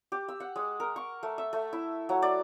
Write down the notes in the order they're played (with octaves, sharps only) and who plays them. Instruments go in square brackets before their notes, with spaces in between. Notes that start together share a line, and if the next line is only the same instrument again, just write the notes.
[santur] G4
E6
F#5
G#3
A#4
C#6
A3
E5
A3
E4
F#3
D5